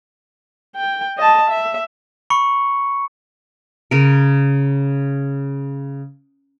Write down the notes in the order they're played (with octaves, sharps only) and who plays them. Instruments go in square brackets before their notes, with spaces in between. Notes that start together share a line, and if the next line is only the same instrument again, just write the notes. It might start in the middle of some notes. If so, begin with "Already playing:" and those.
[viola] G5
D#5 A5
E5
[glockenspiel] B5 C#6 C#7
[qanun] C#3 A#4